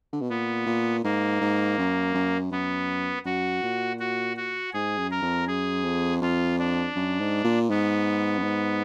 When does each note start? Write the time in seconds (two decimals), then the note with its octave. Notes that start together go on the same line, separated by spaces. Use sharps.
0.13 D3
0.21 B2
0.29 A#2 B3
0.66 A#2
1.04 G#2 A#3
1.41 G#2
1.78 F#2
2.14 F#2
2.51 F#2 B3
3.25 F#2 F#4
3.63 A#2
3.99 F#4
4.36 F#4
4.73 G#2 G#4
4.98 F#2
5.11 A#4
5.22 F2
5.47 F#2 G#4
5.84 F2
6.21 F2 F4
6.59 D4
6.96 F#2
7.20 G#2
7.44 A#2
7.69 G#2 B3
8.39 F#2
8.43 G#2